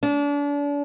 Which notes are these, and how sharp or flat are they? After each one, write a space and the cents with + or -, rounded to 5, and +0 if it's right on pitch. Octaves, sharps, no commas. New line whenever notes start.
D4 -35